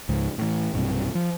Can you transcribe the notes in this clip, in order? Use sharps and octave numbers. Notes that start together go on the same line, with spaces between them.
C#2 G#2
A2 E3
B1 G2 C3
F3